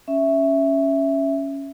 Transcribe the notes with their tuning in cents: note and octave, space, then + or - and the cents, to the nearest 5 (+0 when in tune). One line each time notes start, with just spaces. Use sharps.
C#4 +0 E5 +0